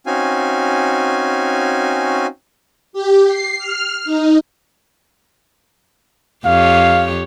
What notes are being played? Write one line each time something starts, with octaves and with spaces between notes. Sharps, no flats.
C4 C#4 D#4 F#4 F5 G#5
G4
C7
F6
D#4
F2 G4 C#5 F5